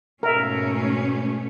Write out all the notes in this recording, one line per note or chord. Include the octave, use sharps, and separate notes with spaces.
G#2 B2 A3 C#4 A#4 E5